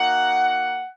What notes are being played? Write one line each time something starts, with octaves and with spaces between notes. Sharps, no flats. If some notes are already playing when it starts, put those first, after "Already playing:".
Already playing: A#3 D#4 F#4 F#5